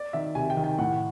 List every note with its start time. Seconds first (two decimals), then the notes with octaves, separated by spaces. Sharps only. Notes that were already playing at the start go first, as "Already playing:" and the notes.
Already playing: D5
0.13 D#3 E5
0.35 C3 G#5
0.50 G5
0.57 D#3
0.64 G5
0.78 A2 F#5